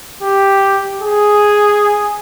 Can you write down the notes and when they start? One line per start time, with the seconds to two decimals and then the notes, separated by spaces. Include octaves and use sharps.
0.22 G4
1.02 G#4